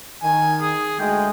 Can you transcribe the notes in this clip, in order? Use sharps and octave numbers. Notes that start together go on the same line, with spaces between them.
D#3 G#5
G#4
D2 G#3 A3 G5